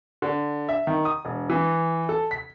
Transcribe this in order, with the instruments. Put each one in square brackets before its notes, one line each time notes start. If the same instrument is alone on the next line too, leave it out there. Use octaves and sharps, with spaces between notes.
[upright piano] D3
E5
D#3
D#6
E1
E3
A4
B6